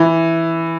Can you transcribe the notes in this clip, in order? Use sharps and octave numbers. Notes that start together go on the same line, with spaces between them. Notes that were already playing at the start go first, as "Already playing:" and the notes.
Already playing: E3